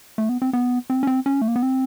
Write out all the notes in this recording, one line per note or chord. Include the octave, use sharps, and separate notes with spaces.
A3
B3
C4
B3
C4
C#4
C4
C#4
A3
A#3
B3
C4